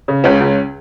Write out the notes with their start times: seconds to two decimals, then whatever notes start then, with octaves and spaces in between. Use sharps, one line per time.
0.08 C#3
0.24 C#2 C#4
0.40 C#2